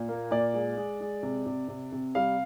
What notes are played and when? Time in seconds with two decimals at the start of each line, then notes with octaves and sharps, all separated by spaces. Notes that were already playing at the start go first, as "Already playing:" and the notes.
Already playing: A#2
0.08 A#3
0.31 A#2 D5
0.54 G#3
0.77 G#3
1.01 G#3
1.23 C3
1.46 C3
1.68 C3
1.92 C3
2.15 G3 F5